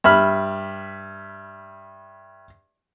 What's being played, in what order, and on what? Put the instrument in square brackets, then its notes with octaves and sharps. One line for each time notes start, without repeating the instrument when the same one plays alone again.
[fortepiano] G2 E5 B5 F6